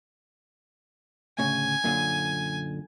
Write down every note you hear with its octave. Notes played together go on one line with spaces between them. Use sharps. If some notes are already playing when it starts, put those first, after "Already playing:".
D2 A2 C#3 G#5
F#2 A#2 D3